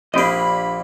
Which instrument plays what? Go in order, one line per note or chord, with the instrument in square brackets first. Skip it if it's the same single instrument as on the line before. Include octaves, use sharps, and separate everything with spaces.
[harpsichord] A#1 A#3 [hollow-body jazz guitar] D4 G4 D#5 [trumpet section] B5